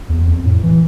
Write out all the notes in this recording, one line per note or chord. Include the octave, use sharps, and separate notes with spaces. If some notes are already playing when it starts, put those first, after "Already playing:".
E2
F2
A2
E3